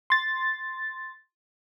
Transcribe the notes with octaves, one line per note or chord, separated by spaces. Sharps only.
C6 A6